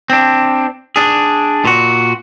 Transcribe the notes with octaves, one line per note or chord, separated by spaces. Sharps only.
C4 D4
D4 G#4
A#2 F#4